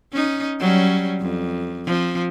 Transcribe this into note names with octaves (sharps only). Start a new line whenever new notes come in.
C#4 D#4
F#3 G3 C#4
F2
F3 C4